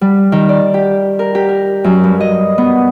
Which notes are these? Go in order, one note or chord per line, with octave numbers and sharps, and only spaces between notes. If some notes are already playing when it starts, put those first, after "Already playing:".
G3
D#3
D5
G4
A#4
G4
A#4
F#2
G2
D#5
B3